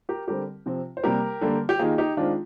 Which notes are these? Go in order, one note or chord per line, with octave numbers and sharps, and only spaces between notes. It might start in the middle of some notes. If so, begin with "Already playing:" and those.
G4 A#4
D3 G3 C4 G4 A#4
C3 F3 C4
C5
C3 G3 A#3 G4 A#4
D3 G3 A#3
G4
D#3 A#3 F4 G#4
D#4 G4
D#3 G#3 C4 D4 F4